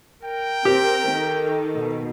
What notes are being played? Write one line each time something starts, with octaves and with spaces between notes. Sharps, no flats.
A#4 G5
C4 G4
D#3 A4
B2